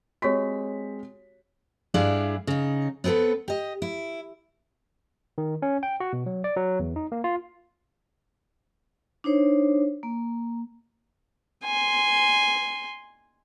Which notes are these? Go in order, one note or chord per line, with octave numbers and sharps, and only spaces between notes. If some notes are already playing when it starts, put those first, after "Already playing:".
G#3 C4 F#4 G4 C#5 B6
G2 D4 E4 G#4 F5
C#3 D#4
B3 C4 G4 A4 B4
G4 D#5
E4
D#3
C#4
G5
F#4
B2
F#3
D5
F#3
E2
D#4
A#3
F4
D4 D#4 C5 C#5
A#3
G#5 C6